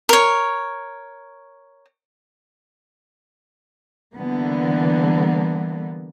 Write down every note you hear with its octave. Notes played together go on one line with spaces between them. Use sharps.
A#4 C#5
D3 E3 G3 A#3 B3